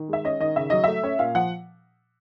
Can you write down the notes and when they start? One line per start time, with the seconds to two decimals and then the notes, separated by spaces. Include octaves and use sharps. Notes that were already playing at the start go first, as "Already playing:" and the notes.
Already playing: D#3
0.08 G#3 E5
0.25 C#4 D#5
0.40 D#3 D#5
0.56 C#3 E5
0.70 F#3 D#5
0.84 A3 E5
1.03 C#4
1.19 A#2 F5
1.35 F3 F#5